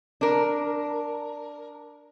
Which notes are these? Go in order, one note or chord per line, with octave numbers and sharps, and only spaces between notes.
D4 A#4